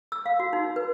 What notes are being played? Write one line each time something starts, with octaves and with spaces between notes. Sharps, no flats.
E6
F5
F#4
D#4
B4